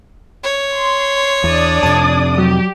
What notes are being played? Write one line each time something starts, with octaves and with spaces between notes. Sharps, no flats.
C#5
C6
E2 D4 D5 D#6
F2 C3 A5 G#6
F#3 G4